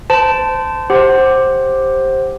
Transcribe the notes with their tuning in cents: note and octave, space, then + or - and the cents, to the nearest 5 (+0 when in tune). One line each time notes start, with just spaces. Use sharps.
C5 -25 A5 +0
G4 +0 C5 +15 F#5 +15